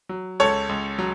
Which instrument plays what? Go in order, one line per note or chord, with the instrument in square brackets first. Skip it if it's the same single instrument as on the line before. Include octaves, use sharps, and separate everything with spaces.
[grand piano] F#3
C#2 A4 C#5
C#2
F#3